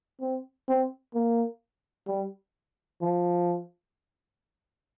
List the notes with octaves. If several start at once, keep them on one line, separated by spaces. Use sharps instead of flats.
C4
C4
A#3
G3
F3